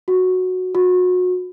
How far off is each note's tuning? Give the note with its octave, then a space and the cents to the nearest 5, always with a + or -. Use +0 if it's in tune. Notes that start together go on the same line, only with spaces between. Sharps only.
F#4 -5
F#4 -30